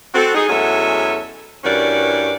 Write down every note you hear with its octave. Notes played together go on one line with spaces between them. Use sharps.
C4 F#4 A4
D#4 G#4
E2 F#3 G#3 C#4 A4 E5
G2 E3 C#4 F#4 A#4 D5